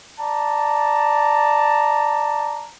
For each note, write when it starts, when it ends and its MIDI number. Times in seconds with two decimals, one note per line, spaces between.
0.20 2.68 74
0.20 2.68 81
0.20 2.68 82